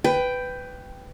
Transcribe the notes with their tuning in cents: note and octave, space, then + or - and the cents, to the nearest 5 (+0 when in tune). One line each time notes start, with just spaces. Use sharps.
B4 +15 G5 +0